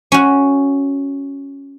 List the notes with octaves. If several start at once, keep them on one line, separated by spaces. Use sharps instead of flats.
C#4 F#4